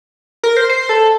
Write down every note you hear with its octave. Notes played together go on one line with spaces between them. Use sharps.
A#4
C5
C5
A4